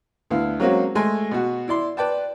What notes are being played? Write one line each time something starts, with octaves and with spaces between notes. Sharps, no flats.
D2 B3 E4 F5
F#3 G#3 A#3 C4 C#4 F#4
G#3 A3 G#5 C6
B2 F#4
E4 D5 C6
B4 D5 G5 A5